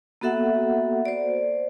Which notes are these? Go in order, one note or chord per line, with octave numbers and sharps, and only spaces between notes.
A#3 B3 F#4 A4 E5 F#5
C5 D5